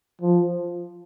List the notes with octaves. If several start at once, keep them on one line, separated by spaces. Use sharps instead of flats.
F3